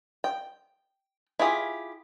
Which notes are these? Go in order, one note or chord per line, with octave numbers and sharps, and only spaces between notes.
G5
E4 F4 G4 G#4